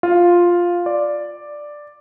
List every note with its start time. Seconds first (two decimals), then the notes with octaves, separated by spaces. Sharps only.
0.03 F4
0.86 D5